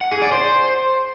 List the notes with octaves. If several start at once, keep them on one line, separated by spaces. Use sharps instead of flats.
F#5
G#4
D5
C5